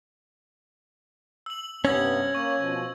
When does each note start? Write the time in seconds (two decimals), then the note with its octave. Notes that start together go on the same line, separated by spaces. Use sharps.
1.46 E6 F#7
1.85 G2 C3 B3 C#4 E6 G#6 A#6
2.35 A#3 C#5 C#6
2.58 B2 F3